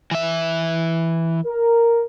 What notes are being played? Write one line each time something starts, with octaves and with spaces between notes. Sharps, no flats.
E3 E5
A#4